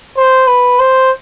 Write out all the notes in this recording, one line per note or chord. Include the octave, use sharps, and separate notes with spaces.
C5
B4
C5